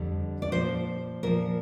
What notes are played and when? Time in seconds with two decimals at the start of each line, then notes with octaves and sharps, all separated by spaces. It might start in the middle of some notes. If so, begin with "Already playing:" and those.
Already playing: F2 D3 G3
0.42 D5
0.52 A#2 F3 C5
1.23 A#2 F3 A#4